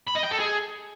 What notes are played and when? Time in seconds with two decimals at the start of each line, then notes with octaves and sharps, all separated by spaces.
0.07 B5
0.15 D#5
0.23 G5
0.31 A4
0.39 G#4